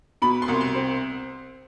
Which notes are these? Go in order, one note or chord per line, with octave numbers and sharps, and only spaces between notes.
B2 B5
C6
C2
C6
C4